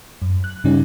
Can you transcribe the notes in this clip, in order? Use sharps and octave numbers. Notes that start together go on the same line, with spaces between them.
F#2
F#6
G2 C#3 G3 C#4 D#4